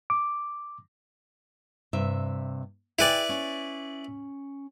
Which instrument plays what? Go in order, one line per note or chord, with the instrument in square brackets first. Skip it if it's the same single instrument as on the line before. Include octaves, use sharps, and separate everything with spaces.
[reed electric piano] D6
[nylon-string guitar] G2 C3 E5
[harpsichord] E4 B4 D5 [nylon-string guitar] G#4 G5 G#5
[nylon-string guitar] C#4